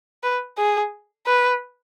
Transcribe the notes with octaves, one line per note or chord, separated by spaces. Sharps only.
B4
G#4
B4